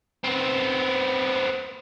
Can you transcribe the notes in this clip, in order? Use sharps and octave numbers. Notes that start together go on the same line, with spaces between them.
B3 C4